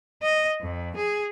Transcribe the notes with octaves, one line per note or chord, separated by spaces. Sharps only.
D#5
F2
G#4